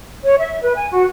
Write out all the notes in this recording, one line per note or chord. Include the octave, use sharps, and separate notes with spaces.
C#5
E5
B4
G#5
F#4